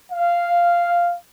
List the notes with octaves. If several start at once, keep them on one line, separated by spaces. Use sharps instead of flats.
F5